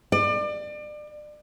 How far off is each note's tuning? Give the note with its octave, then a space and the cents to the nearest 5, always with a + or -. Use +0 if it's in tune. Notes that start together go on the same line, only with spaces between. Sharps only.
D5 +30